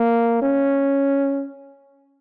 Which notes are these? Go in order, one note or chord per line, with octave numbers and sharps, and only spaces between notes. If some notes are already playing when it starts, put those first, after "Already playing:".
Already playing: A#3
C#4